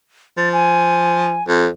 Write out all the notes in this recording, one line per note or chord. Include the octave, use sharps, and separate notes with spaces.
F3 A6
G#5
F2